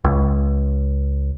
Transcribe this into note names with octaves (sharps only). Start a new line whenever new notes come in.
C#2